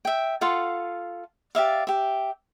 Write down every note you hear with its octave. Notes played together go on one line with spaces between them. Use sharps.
E5 G5
F4 A4 F5 F#5
G4 D5 E5 F5
G4 E5